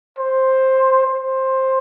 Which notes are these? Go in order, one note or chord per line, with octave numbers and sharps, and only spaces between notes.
C5
C5